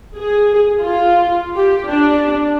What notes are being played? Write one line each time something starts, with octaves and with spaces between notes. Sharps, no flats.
G#4
F4
G4
D4